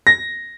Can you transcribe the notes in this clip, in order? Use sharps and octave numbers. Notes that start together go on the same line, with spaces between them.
A#6